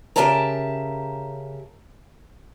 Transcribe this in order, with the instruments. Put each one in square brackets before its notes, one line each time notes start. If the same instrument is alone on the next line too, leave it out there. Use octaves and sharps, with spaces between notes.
[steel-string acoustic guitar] C#3 G4 A#4 E5 A5 A#5